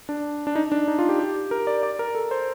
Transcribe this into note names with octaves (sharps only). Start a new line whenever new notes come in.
D4
D4
D#4
D4
D#4
F4
G4
G4
A#4
D5
D5
A#4
A4
C5